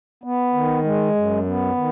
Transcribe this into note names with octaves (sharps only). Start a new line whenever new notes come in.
B3
D#3
G#3
F#2
B3
D#3